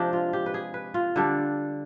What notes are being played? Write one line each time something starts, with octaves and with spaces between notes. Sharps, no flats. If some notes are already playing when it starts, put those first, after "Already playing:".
Already playing: C3 F3 G#3 D4 G4
F4
G4
B4
G#4
B4
F4
D3 G3 D4